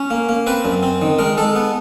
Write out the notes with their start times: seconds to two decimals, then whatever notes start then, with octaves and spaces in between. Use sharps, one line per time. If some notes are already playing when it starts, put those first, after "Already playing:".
Already playing: C#4
0.10 A#3
0.29 A#3
0.47 C4 B4
0.65 F#2
0.83 C4
1.02 D#3
1.19 G#3 A#4
1.37 G#3 A4
1.56 B3